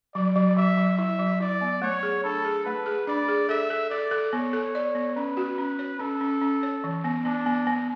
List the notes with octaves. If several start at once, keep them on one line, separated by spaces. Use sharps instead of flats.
F#3 D5
F#3
F#3 E5
F#3
E4 E5
F#3
E4 D5
B3
A3 C#5
G#4
D4 A4
G#4
A3 B4
G#4
D4 D5
G#4
A4 E5
A4
A4 D5
A4
B3 C#5
A4
D5
B3
C#4 B4
F#4
C#4
C#5
C#4 A4
C#4
C#4
C#5
E3
B3
B3 D4
B3
B3